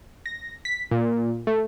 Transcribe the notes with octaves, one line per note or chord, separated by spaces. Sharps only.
A#6
B6
A#2
A3